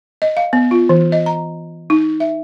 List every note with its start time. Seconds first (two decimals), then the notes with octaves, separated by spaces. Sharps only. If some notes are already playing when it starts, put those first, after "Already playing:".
0.22 D#5
0.37 F5
0.53 B3
0.71 F4
0.89 E3
1.12 D#5
1.26 A#5
1.90 D#4
2.20 E5